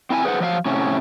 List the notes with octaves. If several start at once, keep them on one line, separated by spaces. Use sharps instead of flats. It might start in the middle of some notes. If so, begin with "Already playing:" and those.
C4 E4 F5 G#5
G#4 B4 C5 F5 F#5
F3 F#3 E5 F5
A2 C3 C#4